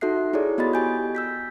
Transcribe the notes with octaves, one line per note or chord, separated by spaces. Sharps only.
D#4 F#4 A4 E5 F#6 C7
E4 G#4 A4 C#5 D5
B3 F#4 D#5 B5 A6
G4 G#5 G6
E6 G6 B6